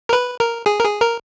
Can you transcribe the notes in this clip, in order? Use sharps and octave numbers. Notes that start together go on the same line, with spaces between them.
A#4
B4
A#4
G#4
A#4
G#4
A#4